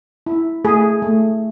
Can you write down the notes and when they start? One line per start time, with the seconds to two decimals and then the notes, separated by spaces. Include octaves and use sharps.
0.26 E4
0.64 A3 G#4
1.02 A3